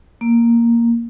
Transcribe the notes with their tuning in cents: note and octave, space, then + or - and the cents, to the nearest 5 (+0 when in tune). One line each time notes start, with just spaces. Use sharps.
A#3 +0